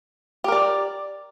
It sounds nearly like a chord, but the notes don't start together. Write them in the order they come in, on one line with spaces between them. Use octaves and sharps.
G4 A#4 D5